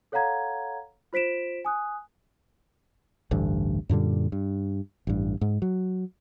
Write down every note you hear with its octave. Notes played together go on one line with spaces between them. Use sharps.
A4 C#5 F5 F#5 A#5 G#6
F4 C5 B6 D7 E7
G#5 D#6 F#6
A1 D2 G2
F#2 A#2 D3 G3
G2
A1 G2
G#2
F#3